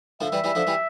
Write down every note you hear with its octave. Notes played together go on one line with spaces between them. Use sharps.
D3 F3 E5
E3 G3
E3 G3
D3 F3
E3 G3